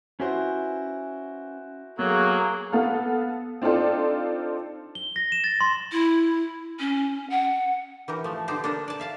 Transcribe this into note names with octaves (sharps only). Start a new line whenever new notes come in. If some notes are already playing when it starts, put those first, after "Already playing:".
C#4 E4 F#4 B4 C5 G#5
F#3 A#3 B3 G#4 A4
B3 A4 F5
C4 D4 D#4 F4 A4 C5
G7
A#6
E7
A6
C6
E4
C#4
F#5
E3 G4 A#4
F3 A3
B2 D3 D#4 G4 C5
D4 G4 A4 A#4 D5
D5 A5
E5 F5 A5